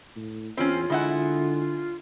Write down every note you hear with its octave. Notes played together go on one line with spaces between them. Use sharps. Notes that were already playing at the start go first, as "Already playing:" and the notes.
A2
E2 C4 C#4 F4
D3 G#3 E4 F#5